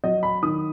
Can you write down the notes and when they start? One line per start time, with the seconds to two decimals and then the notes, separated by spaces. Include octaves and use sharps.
0.04 F#3 D#5
0.23 B5
0.42 D#3 D#6